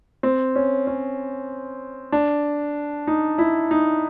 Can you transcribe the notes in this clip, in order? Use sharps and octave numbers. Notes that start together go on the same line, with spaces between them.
C4
C#4
C#4
D4
D#4
E4
D#4